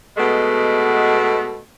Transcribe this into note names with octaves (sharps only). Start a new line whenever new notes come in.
B2 G#3 A3 B3